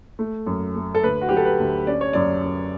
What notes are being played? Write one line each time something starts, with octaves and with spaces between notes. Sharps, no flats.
A3
F#2
A3
A4
D2 B4
F#4
F#3 G4
A4
B4
D2
C#4 D5
C#5
F#2 D5
F#2